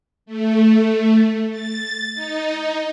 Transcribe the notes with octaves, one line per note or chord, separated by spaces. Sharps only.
A3
A6
D#4